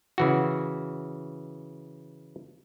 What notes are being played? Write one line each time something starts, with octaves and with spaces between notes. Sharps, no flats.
C#3 E3 F#4